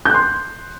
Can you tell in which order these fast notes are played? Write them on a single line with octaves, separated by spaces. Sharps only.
G6 F#6 C6